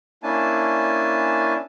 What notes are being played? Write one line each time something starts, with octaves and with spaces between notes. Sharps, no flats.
A#3 C#4 D4 E4 G#5 A5